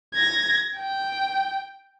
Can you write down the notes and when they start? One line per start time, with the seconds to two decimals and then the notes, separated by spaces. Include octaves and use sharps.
0.15 G#6 A#6
0.77 G5